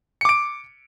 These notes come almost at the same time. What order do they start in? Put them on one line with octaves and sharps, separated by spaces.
C#7 D6 D7